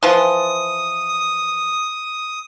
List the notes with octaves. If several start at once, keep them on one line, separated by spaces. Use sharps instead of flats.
E3 F3 D#6